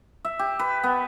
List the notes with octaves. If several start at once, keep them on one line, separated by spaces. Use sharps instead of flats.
E5
G4
B4
B3